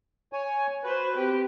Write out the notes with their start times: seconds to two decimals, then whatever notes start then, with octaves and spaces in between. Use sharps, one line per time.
0.33 C#5 G#5
0.84 F#4 B4 C5
1.16 C4 G4